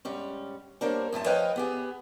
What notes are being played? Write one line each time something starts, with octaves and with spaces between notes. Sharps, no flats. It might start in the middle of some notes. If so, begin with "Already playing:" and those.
G#2 G3 C#4
G3 A#3 D4 A#4 C5 C#5
F#2 A2 F3 A5
F3 B4 C#5 D#5 F5 G5
B3 G4 G#4